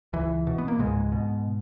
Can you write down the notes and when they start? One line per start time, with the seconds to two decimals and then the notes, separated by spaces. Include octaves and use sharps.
0.13 C#2 E3
0.47 B2
0.58 B3
0.68 A#3
0.78 C#2 G#2 G#3
1.12 B2